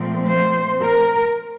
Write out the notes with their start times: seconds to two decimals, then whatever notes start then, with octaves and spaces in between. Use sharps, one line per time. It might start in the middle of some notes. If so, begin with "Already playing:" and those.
Already playing: A#2 F3 A3 C4
0.26 C5
0.81 A#4